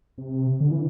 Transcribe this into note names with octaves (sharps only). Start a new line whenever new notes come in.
C3
D3
E3